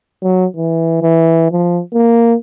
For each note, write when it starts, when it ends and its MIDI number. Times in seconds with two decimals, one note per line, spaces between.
0.23 0.45 54
0.56 0.98 52
1.02 1.51 52
1.52 1.81 53
1.94 2.35 58